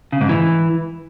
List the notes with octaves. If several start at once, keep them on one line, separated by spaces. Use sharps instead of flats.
C#3
G#2
E3